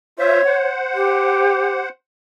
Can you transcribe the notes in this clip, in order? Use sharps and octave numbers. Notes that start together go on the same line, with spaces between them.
F4 C5 C#5 E5
C5 F#5
G4